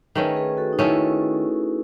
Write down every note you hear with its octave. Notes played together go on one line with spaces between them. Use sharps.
D#3 A3 C#4 G#4 B4
G#4 B4
F#4 A4
D#4
D#3 A3 C#4 E4